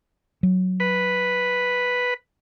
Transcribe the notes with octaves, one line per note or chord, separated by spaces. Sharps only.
F#3
B4